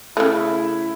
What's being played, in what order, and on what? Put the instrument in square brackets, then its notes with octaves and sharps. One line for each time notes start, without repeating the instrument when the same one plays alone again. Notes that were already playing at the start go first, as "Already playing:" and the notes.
[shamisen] C#3 A3 [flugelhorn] E4